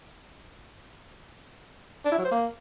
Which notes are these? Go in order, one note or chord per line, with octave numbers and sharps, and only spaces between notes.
D4
E4
F#3
C5
A#3